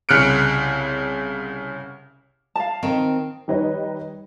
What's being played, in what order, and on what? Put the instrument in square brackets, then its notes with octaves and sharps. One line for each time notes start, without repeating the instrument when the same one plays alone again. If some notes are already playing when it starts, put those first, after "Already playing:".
[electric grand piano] C2 C#3 F6 F#6 C#7 D7
[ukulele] F5 A5
[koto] D#3 [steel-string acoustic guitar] C4
[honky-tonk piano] D#3 G3 D#4 B4 C#5 D#5